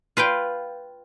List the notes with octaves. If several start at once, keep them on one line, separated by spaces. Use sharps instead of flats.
F4 B4 F5 G5